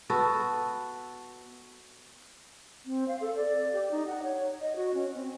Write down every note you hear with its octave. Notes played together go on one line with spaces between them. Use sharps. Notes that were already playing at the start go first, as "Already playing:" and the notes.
B3 F#4 A4
C4
F5
A4
D5
G4
D#4
F#5
C#5
D#5
F#4
C#4
C4